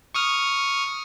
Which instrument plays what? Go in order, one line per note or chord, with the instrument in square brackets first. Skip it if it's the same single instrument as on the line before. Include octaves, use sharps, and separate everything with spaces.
[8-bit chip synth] C#6 D#6 F6